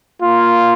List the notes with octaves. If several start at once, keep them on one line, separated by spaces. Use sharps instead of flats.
A#3 F4